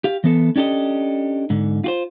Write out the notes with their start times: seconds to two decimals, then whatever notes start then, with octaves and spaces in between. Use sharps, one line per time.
0.04 G4 F5
0.24 E3 B3 A4
0.56 C#4 D4 G4 A4 D#5
1.50 G#2 D3
1.84 F4 F#4 C5